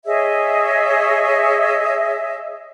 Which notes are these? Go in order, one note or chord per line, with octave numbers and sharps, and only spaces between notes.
G#4 C#5 D#5 E5